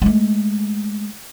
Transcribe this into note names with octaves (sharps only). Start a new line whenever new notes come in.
G#3 A3